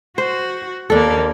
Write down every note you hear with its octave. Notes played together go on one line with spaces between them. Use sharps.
F#4 C5
D#2 A#3 D4 A4